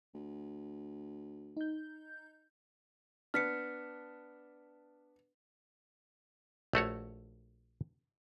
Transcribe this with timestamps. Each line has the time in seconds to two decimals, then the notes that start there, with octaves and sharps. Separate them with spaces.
0.14 D2
1.57 D#4 G6
3.34 B3 D4 F6 B6 C#7
6.73 A#1 A3 F#4 C#5